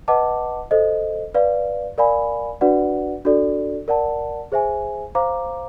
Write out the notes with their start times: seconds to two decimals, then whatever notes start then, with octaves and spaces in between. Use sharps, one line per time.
0.08 B4 D#5 F#5 A5 D6
0.71 A4 C5 D#5
1.35 B4 D5 F5
1.98 A#4 D5 F5 G#5 B5
2.61 D4 F#4 B4 D5 F#5
3.25 D4 F#4 A4 D5
3.88 A#4 D5 F#5 A5
4.52 G#4 C5 E5 G#5
5.15 C5 F5 A#5 D6